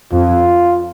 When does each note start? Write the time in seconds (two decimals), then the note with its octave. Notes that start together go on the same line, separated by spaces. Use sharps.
0.12 F2 F4